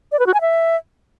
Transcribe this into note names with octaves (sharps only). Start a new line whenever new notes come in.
D5
B4
F#4
G#5
E5